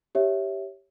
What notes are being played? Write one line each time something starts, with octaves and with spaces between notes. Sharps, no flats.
G4 C#5 E5